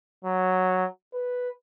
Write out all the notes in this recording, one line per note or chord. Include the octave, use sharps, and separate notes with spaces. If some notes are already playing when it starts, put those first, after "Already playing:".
F#3
B4